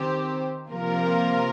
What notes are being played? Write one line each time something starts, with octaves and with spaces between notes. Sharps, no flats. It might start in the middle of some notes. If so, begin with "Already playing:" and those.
Already playing: D#3 C4 G4 C5
C3 F3 A#3 F4 A#4